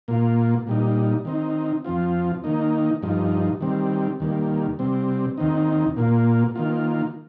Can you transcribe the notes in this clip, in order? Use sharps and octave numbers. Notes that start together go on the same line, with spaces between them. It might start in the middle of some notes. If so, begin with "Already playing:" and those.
A#2 A#3 F4
A#2 G3 D#4
D#3 C4 D#4
F2 F3 C4 F4
D#3 A#3 D#4
G2 F3 D#4
D#3 G3 C4
D#2 D#3 G3 A#3
C3 G3 C4
D#2 D#3 C4 D#4
A#2 A#3 F4
D#3 A#3 F4